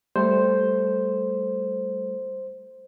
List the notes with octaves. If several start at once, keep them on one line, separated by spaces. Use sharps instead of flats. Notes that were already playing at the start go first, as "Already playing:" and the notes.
G3 A3 A4 C5